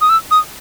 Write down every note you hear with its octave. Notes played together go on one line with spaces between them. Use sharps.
D#6
E6
D#6